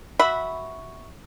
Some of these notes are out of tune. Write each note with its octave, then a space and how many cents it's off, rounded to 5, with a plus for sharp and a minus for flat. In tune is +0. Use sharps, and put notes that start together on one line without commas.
F#4 +0 E5 -10 B5 +0